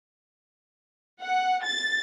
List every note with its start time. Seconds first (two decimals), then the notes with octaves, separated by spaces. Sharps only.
1.21 F#5
1.64 A6